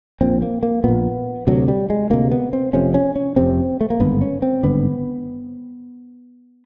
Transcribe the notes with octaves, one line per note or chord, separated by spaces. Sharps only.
A#1 A#2 C4
A#3
A#3
A#1 A#2 B3
D2 C3 F#3
G3
G#3
D2 C3 A#3
B3
C4
F1 F2 C3 C#4
C#4
C#4
F1 F2 C3 C4
A3
A#3
G#1 G2 D3 B3
C#4
C4
G#1 G2 D3 B3